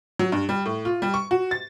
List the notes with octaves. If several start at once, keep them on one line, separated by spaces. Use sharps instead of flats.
F#3
G2
G3
A2
F4
G3
C#6
F#4
A6